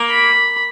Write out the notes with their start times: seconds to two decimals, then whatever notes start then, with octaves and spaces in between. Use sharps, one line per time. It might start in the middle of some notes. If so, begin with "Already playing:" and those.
Already playing: A#3
0.10 B5